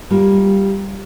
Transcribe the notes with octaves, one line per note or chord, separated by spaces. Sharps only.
G3 A#3 F4